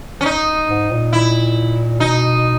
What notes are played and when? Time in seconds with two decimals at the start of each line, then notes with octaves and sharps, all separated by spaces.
0.21 C#4
0.25 D#4
0.69 G#2
0.92 A#2
1.13 E4
2.00 B2 D#4